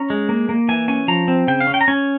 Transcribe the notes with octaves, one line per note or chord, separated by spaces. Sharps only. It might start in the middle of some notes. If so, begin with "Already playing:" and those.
Already playing: C#4 A#5
G#3
A#3
A#3
E3 G#5
C#4 G#5
F3 A#5
C4
C#3 G5
F5
C#4
G5
A#5
C#4 G#5